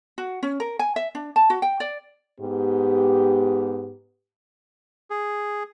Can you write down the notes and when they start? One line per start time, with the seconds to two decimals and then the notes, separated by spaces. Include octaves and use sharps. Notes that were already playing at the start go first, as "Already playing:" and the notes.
0.18 F#4
0.43 C#4
0.60 A#4
0.79 G#5
0.96 E5
1.15 D4
1.36 A5
1.50 F#4
1.62 G5
1.80 D5
2.40 G#2 B3 G4
5.10 G#4